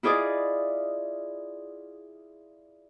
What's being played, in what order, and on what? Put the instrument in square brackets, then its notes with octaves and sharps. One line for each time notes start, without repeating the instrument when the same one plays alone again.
[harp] E4 F4 G#4 D5 D#5